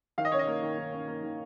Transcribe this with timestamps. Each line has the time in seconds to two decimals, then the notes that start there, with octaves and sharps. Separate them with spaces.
0.18 D#3 F5
0.25 D#5
0.32 C#4 C#5
0.39 D#5
0.47 A#3
0.63 D#3
0.78 D#3
0.92 C#4
1.08 A#3
1.23 D#3